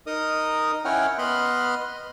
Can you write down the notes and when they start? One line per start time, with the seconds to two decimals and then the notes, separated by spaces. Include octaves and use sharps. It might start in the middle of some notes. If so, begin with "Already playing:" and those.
0.07 D#4 A#4 D#5 D#6
0.85 C#4 E4 C#5 F#5 G5 F6
1.18 B3 D#5 B5 C6 F6 F#6